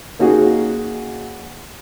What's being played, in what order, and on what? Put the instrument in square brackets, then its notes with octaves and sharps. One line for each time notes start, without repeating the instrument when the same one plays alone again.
[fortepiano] A#3 C#4 D#4 F#4 G#4